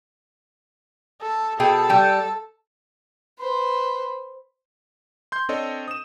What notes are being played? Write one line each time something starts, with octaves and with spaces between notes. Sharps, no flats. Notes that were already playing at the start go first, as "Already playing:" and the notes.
A4
B2 G#4 A4 G5
G3 G5
B4 C5
C6 G6
C4 D4 A4 C#5 D#5
D#6 E7